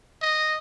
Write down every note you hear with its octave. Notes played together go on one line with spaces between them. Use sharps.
D#5